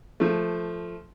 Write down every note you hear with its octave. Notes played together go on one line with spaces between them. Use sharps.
F3 A3